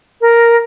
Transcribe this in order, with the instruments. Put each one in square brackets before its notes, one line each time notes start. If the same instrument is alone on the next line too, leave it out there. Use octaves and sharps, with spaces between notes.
[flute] A#4